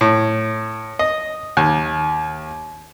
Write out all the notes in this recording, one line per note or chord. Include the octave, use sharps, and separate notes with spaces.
A2
D#5
D#2